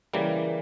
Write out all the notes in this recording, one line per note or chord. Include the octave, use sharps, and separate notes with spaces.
C#3 E3 G3 A#3